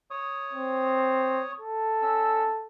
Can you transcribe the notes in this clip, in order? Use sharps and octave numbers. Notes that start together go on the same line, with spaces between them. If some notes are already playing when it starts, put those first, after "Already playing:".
C#5 D#6
C4
A4
C#4 E6